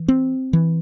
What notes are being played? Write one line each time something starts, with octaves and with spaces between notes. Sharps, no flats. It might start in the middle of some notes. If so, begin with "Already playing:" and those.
Already playing: E3
C4
E3